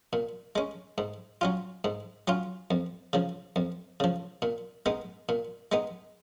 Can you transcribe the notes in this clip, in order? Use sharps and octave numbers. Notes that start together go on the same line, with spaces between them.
A#2
G#3 C#4
G#2
F#3 C#4 F4
G#2
F#3 C#4 F4
F2
C#3 F3
F2
C#3 F3
A#2
G#3 B3 D#4
A#2
G#3 B3 D#4